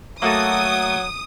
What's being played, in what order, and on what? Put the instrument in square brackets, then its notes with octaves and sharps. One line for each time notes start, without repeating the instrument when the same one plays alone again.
[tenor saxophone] F#3 [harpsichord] A3 [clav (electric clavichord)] A#3 F#4 A4 [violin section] D#6